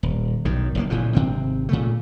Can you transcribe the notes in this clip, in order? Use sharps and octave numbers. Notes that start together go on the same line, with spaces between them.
D#1
B1 F#2 D#3
F#1 D#3 A#3
A#2 C#3 E3 F3
G#1 C3 C4
A#2 C#3 A3